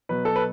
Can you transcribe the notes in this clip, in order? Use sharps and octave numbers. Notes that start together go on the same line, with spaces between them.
B2 F#3 B4
A4
B4